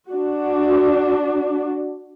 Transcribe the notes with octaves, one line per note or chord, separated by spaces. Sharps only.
D4 F#4